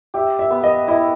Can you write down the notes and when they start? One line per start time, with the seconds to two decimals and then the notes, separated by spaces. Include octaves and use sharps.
0.14 G4 E5
0.39 E5
0.51 B3
0.63 D#5
0.87 E4 D#5